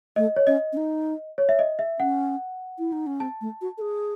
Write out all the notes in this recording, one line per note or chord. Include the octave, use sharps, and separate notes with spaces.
A3 D#5
C#5
C#4 D#5
C#4
D#4
C#5
E5
D#5
E5
C#4 F#5
E4
D#4
C#4
C4 A5
A3
F#4
A4
G#4